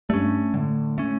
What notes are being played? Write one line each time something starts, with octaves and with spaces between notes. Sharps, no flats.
G2 A3 C#4
A2 D3
A3 C#4